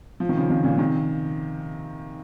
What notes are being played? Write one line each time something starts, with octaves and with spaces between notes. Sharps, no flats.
F3
D#3
C#3 F3
C3 D#3
A#2 C#3
C3 D#3